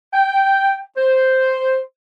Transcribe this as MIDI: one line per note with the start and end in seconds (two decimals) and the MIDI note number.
0.14 0.81 79
0.97 1.80 72